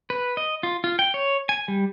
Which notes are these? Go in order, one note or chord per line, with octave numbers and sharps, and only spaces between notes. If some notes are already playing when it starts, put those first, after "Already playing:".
B4
D#5
F4
F4
G5
C#5
G#5
G3